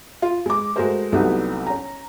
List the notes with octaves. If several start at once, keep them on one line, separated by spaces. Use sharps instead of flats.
F4
G#3 D6
G#3 A3 F#4 A#4 C5
C2 F#3 A3 B3 D#4 G4
C#4 A#5